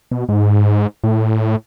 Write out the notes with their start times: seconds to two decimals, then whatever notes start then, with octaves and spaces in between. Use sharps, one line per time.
0.12 B2
0.29 G#2
1.04 A2